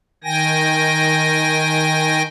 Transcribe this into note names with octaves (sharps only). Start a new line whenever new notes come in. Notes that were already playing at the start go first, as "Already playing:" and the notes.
D#3 G5 G#5 A#6